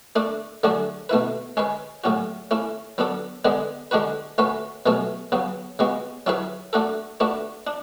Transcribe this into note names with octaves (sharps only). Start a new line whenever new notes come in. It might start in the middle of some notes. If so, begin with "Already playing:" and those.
A3 D4 A4
D3 F#3 A3 D4 G#4
B2 A3 E4 B4
G#3 C#4 G#4 B4
A2 F#3 C#4 F#4
A3 C#4 E4
F#3 B3 D4 A4
D3 G#3 B3 D4 G#4
D3 G#3 D4 F#4 B4
A3 C#4 F#4 B4
B2 F#3 A3 C#4
C#3 F#3 B3
C#3 G#3 B3 F#4
F#3 C#4 E4 G#4 B4
A3 D4 F#4 A4
A3 D4 F#4 B4
D4